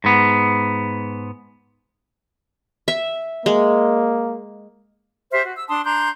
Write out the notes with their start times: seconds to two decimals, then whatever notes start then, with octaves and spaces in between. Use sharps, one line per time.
0.04 G#2 B3
2.88 E5
3.46 G#3 A#3
5.31 G4 C5 E5 F6
5.44 F#4
5.56 E6
5.69 D4 A5 C6 D#6
5.84 D4 A#5 C6 G6